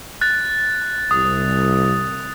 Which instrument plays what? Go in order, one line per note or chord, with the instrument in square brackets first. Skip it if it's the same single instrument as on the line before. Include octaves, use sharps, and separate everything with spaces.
[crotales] F#6 A6
[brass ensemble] C2 [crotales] D#6